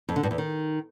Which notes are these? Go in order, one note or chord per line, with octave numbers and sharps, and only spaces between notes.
F2
D3
G2
E2
D#3